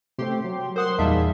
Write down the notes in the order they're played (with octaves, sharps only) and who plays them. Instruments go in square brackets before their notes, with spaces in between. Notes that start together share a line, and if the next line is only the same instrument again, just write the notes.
[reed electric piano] C3 A3 C4 [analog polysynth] G4 C6
[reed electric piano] F#3
[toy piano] A#4 D#6 [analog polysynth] C5 F#5 C6
[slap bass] E2 [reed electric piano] A#2 D#4 F5 [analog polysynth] G3 G#4 E5 [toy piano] A5